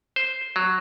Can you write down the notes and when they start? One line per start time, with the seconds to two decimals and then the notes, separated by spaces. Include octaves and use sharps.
0.16 C5
0.56 F#3